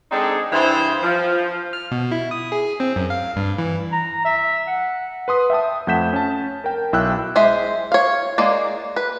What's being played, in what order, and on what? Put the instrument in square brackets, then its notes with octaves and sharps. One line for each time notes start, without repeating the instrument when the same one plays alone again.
[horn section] G#3 C4 D4 D#4 G#4 A4
G2 E3 C4 E4 G#4 C5
F3
[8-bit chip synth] F6
B2
E4
D#6
G#4
C4
F#2
F5
G2
E3
[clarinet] A#5
E5
F#5
[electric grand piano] B4 C6 D#6
E5 G5 A5 D#6
F2 A3 F#5 G6 B6 E7
C#4 A5
A#4 G5
B1 E4 G5 E6 F#6
[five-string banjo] G#3 C5 E5
C#5 F5
G#3 A#3 D5
B4